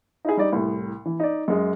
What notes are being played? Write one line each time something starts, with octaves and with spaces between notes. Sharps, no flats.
D#4 E4 G#4
G3 D#4 D5
C2 A2
E3
D#4 D5
F#2 G#3 D#5